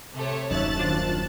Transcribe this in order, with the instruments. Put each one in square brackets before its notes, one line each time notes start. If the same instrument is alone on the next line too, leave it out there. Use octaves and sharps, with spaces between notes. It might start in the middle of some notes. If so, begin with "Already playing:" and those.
[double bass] C3 [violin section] A3 C#5
[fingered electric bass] D#1 F#2 [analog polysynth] D#4 C#5 E5 [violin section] A5 F#6 A6
[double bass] D#3 [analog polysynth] D4 F4 C5